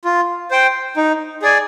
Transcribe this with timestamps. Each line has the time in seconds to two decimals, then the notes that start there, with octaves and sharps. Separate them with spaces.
0.05 F4
0.51 C5 G5
0.96 D#4
1.42 G#4 D5 G#5